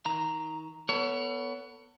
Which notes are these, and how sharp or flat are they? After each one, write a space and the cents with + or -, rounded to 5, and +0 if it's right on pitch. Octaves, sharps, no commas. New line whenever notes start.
D#3 +30 A#5 +0
B3 +0 A4 +35 C#5 +25